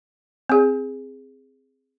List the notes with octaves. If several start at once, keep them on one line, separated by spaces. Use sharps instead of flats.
C4 G#4